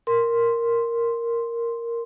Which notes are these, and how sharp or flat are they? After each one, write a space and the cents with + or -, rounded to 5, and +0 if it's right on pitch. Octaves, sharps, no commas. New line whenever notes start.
A#4 +0 C6 +0